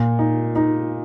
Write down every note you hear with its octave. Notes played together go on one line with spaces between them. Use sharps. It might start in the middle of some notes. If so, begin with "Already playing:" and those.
Already playing: A#2
D#4
D#4